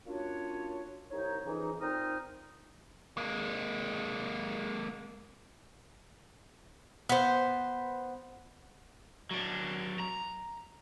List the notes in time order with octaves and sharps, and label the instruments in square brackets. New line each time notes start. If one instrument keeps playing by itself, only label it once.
[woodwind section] A#3 C#4 D4 F4 F#4 C#5
C2 D#4 C#5
F2 C#3 E3 D#4
A#2 C4 D#4 A#5 D#6 F6
[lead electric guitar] G#3 A#3
[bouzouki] B3 C5
[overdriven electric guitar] F#3 D4
A#5